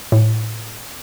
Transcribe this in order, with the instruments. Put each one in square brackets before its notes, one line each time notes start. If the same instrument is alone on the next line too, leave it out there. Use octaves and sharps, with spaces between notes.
[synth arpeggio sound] A2